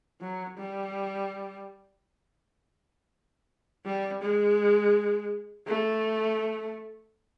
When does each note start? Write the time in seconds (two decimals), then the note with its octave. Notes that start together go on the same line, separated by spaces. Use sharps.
0.21 F#3
0.58 G3
3.86 G3
4.22 G#3
5.68 A3